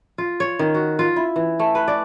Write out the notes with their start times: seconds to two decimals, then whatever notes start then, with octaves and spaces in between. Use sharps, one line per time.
0.18 F4
0.40 C#5
0.59 D#3
0.74 F#4
0.99 F4
1.16 E4
1.36 E3
1.60 A3
1.75 B4
1.88 D5